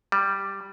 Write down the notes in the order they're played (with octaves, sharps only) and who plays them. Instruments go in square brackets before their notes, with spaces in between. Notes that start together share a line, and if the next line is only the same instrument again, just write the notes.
[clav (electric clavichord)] G3